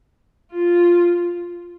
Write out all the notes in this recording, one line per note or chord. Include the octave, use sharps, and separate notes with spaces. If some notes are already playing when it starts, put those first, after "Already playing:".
F4